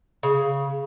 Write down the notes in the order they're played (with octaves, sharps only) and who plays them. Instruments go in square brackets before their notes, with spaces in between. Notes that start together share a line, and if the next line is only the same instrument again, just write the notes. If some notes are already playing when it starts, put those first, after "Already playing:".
[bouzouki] C#3